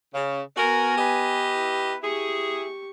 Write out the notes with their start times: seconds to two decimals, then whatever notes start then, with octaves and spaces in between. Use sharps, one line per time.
0.13 C#3
0.56 B3 F#4 A#4 G#5
0.96 G4 B4 D#5
1.53 E4
2.02 E4 G4 G#4 C#6